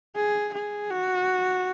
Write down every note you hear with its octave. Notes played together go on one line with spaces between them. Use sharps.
G#4
G#4
F#4